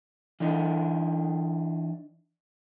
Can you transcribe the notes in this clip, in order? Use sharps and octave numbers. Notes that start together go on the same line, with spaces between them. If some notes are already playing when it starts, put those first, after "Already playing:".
E3 D4 D#4